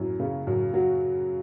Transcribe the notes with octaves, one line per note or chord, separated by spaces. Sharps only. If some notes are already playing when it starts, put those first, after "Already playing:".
Already playing: F#2 E4
C#3
F#2
F#3